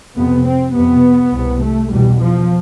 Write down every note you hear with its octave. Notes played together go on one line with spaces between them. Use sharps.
F2 C3 B3
C4
F2 C3 B3
C2 C3
A3
E2 B2 G3
F3